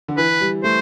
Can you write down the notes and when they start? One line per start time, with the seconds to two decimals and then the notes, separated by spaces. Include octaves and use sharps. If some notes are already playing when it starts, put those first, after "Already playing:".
0.08 D3
0.17 E3 B4
0.41 G3
0.63 A3 C5